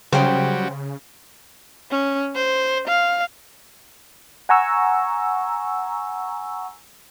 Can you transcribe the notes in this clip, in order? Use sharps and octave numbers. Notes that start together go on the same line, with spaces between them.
C#3 F#3 G3 C5 G5 B5
C#4
C5
F5
F#5 G#5 A#5 C#6 E6